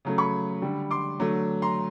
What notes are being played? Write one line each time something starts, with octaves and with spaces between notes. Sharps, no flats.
C#3 F#3 A3
B5 C#6
D3 G3
C6 D6
D3 F#3 A3
A#5 C6